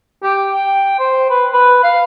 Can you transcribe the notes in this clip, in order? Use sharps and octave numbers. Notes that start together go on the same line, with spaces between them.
G4
G5
C5
B4
B4
F5